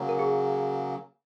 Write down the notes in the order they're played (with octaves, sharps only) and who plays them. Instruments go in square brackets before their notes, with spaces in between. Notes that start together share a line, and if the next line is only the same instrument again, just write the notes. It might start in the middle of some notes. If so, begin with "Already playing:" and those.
Already playing: [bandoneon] C#3 F#3 A#3
[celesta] A#4
G#4